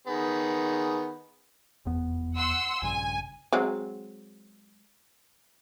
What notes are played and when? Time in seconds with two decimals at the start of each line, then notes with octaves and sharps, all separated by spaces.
0.07 D#3 B3 G#4
1.85 F1 E2 B3
2.35 F#5 C6 E6
2.82 A#1 G2 C#3 G#5
3.53 F#3 G#3 C4